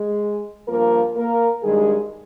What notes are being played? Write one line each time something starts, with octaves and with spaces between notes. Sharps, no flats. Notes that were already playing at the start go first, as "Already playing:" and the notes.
Already playing: G#3 G#4
G2 F3 A#3 A#4
A#3 A#4
G2 D#3 G3 G#3 G#4